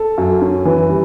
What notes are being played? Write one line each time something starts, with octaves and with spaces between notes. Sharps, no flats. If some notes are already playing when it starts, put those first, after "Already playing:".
Already playing: A4
F#2
C#4
E3
G3